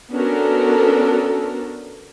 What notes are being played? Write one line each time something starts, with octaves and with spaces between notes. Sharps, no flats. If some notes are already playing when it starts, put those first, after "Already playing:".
B3 C#4 D4 F#4 A4 A#4